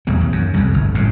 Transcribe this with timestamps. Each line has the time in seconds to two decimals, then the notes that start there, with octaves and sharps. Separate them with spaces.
0.07 E2 B2 E3 G3
0.21 B1
0.32 F#2
0.54 C2 F2
0.74 G1
0.94 A1 F#2 A2